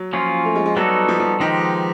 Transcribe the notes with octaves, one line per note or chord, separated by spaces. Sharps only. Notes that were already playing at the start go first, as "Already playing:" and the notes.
Already playing: F#3
F3 A#3 C#4 F4
A3
G#3
G#3
F#3 G3 B3 D#4 F#4 A4
F3
F3
D#3 F3 G#3 B3 D#4 G4